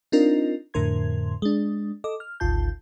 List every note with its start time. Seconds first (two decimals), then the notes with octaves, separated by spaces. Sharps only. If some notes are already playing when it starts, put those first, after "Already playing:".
0.12 C4 D4 D#4 F4 A#4 D#5
0.74 F2 A2 D3 A#4 C6 G#6
1.42 G#3 D4
2.04 A4 D#5 D6
2.20 F6
2.40 G#1 D2 F4 A5 G6